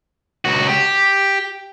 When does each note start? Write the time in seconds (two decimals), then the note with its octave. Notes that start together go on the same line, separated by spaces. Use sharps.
0.45 C#2 F#4
0.69 G4